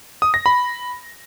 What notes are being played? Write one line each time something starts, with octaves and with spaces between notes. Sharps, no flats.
D#6
A#6
B5